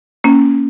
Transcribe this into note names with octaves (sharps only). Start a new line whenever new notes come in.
A#3 C#4